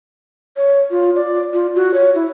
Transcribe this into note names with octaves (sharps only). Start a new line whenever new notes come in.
C#5
F4
D5
F4
F#4
C#5
E4